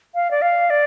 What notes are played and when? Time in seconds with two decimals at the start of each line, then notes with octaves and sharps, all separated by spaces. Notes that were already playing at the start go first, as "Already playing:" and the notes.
0.15 F5
0.31 D5
0.42 F5
0.70 D5